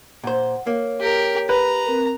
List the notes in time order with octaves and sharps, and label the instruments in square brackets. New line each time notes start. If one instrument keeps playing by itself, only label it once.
[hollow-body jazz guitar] A#2 C5 [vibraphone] F#5
[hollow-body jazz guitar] A#3 [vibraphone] C#5
[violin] G4 A#4
[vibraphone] G4 [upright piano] B4 [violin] A#5
[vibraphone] C4 A#4